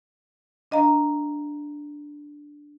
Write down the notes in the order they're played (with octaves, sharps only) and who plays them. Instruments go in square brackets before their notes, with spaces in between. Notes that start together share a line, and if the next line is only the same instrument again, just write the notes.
[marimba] D4 D#5 F5 A#5